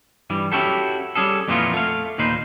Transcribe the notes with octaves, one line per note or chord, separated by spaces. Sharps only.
G2 E3 G3
C#4 E4 F#4 G4 A4
G3 C#4 G#4 A4
F2 A#2 E3 A#3 B3 F4
A3 F5
D#2 A#2 D#4 B4 C5